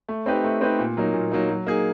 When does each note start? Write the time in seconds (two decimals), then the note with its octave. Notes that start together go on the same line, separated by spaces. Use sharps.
0.09 A3
0.26 C4 D#4 G4 B4
0.44 A3
0.61 C4 D#4 G4 B4
0.79 A#2
0.97 F#3 A#3 D#4
1.14 A#2
1.31 F#3 A#3 D#4
1.50 F#3
1.67 A#3 D#4 G#4